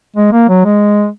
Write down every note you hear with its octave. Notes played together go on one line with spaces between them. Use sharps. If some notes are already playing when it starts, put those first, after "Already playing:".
G#3
A#3
F#3
G#3